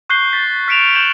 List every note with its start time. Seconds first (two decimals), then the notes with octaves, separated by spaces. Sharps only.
0.10 C#6 F#6 G6 C7 G7
0.33 A6 B6
0.68 F6 B6 C#7 D7 E7 F7
0.94 C#6 G6 E7 F#7